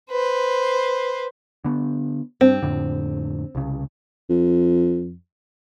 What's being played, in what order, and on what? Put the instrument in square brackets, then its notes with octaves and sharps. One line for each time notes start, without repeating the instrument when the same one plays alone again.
[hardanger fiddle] B4 C5
[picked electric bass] D3 B3
[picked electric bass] G2 [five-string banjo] C4
[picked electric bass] F2 A2 D3
C2 C#3
[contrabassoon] F2